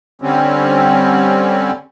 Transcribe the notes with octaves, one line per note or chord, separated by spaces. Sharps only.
D3 G3 C4 C#4